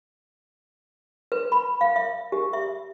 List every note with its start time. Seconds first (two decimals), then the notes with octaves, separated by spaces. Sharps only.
1.32 B4
1.52 B5
1.81 F5
1.96 E5
2.32 G4
2.53 E5